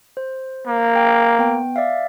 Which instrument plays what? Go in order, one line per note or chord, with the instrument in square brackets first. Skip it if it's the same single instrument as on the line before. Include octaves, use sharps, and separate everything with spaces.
[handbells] C5
[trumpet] A#3
[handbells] G5
B3 G5
D5 E5 F5